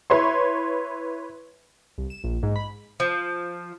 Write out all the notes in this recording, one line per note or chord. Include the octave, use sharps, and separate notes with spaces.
E4 B4 C#5 C6
C2
E7
A#1
G#2
B5
F3